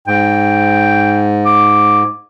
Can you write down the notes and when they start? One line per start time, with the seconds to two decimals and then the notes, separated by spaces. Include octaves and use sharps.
0.07 G#2 G5
1.46 D6